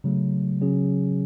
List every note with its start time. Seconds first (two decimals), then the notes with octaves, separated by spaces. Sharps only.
0.04 C#3 F#3 A3
0.61 C#3 F#3 C#4 G#4